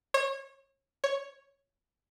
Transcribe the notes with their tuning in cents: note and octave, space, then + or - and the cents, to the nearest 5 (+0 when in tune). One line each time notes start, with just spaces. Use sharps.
C#5 -30
C#5 +0